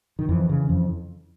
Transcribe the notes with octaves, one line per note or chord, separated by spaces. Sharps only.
D#3
F2 E3
C#3
F2